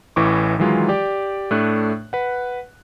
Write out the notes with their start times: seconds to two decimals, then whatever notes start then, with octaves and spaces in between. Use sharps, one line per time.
0.16 A1 A2 E3 C#6 D6
0.59 D#3 E3 F#3 G#3 F4
0.89 G4 D5
1.51 A2 A3 D4 F#6
2.13 B4 F#5